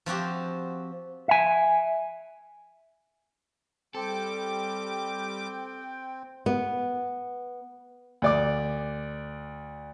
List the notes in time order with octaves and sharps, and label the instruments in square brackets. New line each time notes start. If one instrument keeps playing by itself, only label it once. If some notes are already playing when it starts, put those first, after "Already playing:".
[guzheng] F3 C4 F#4 G4
[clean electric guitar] E5 G#5
[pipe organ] G3 D6 [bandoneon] C4 [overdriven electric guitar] A4 [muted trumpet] G5
[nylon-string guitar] B3
[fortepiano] D2 D5 D6